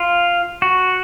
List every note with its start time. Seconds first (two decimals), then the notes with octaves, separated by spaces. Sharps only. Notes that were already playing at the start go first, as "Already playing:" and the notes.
Already playing: F4
0.62 F#4